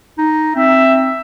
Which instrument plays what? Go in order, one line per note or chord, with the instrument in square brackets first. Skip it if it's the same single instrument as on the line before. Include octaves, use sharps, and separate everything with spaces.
[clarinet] D#4
[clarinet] C4 [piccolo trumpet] E5